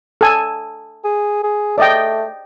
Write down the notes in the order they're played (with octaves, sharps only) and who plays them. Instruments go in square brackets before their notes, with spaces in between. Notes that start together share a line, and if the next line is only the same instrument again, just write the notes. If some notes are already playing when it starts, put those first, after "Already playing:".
[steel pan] A4 G#5
[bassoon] G#4
G#4
[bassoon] A3 [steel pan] D5 D#5 G5